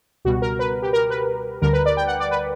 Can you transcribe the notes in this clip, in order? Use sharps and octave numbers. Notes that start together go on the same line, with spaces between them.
C#2 B2 G3 F#4
A#4
B4
G4
A#4
B4
D2 D3 G3 A#4
B4
D5
G5
F#5
D5
B4